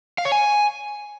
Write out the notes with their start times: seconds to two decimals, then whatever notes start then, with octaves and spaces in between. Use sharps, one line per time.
0.18 F5
0.25 C#5
0.32 G#5